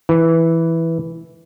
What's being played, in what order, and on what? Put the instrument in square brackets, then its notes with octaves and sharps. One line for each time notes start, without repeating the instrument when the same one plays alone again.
[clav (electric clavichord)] E3